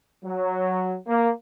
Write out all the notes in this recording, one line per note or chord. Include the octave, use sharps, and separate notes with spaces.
F#3
A#3